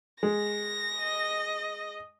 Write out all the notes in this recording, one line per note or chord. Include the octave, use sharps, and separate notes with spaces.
G#3 A#6
D#5